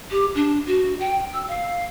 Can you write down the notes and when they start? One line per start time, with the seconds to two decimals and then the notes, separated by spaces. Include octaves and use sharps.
0.10 G4
0.35 D4
0.66 F#4
0.99 G5
1.34 E6
1.48 F5